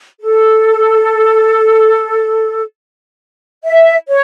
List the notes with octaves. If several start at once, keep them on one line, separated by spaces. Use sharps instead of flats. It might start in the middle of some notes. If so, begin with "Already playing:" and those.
A4
E5
C#5